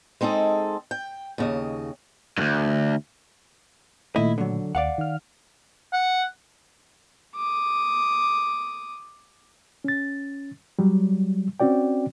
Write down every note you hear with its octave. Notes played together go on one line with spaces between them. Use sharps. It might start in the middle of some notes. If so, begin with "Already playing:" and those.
G#3 C4 D#4 G#4 A4
G5
D#2 C#3 D#5
D2 G2
A#2 D#3 A3 E4 D#5
D3 F#3
D#2 D5 F5 F#5
D#3 F6
F#5
D6 D#6
C#4 A6
F#3 G3
C4 C#4 F#4 D5 G5